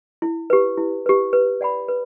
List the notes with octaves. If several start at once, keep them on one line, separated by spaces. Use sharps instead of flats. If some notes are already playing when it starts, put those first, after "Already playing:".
E4
G4 B4
E4
G4 B4
B4
D5 F#5 B5
B4